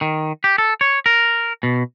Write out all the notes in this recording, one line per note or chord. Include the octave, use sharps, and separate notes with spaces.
D#3
G4
A4
C#5
A#4
B2